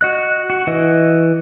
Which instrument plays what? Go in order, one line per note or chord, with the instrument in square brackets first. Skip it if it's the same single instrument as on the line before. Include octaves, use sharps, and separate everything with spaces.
[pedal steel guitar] F#4 D#5 F#6
F#4
E3 D#5